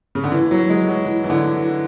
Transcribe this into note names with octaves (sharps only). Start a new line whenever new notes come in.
C#3
D3
E3
F#3
G#3
F#3
E3
E3
D3
E3